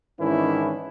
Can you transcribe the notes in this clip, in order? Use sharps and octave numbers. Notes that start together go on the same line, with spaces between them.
G#2 D#3 E3 C#4 D4 E4